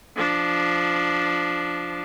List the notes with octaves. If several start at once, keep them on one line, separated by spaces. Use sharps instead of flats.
F3 D4